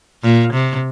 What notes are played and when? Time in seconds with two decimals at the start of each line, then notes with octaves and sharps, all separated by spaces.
0.23 A#2
0.53 C3